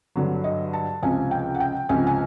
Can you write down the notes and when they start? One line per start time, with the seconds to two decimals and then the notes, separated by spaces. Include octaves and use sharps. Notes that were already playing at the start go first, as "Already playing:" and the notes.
0.16 G2 D3 F#3
0.44 D#5
0.73 A5
1.02 C#2 C3 F3 G#5
1.31 G5
1.54 F#5
1.60 G5
1.89 C#2 C3 F3 G#5
2.07 G#5